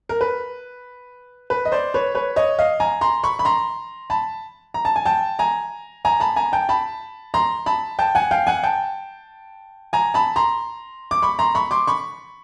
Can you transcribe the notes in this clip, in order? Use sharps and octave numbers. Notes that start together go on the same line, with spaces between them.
A#4
B4
B4
D#5
C5 D5
B4 C#5
B4 C#5
C#5 D#5
D#5 F5
G#5 A#5
A#5 C6
B5 C#6
B5
A#5 C6
A5 B5
A#5
A5
G#5
G5 A5
G#5 A#5
G#5 A#5
A5 B5
G#5 A#5
G5 A5
A5 B5
A#5 C6
A5 B5
G5 A5
F#5 G#5
F5 G5
F#5 G#5
G5 A5
G#5 A#5
A5 B5
A#5 C6
D6
B5 C#6
A#5 C6
B5 C#6
C6 D6
B5 C#6